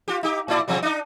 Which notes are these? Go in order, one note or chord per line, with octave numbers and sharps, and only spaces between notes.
F4 G4
D#4 G4
A2 E4 D5
B2 F3 G3
D4 D#4